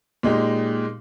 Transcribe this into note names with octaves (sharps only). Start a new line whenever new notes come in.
A#2 G#3 D#4 G4